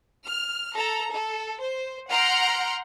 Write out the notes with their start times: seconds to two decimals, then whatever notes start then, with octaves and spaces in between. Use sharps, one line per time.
0.24 F6
0.75 A4 A#5
1.11 A4
1.58 C5
2.09 F#5 A#5 C6 F6 G6 D7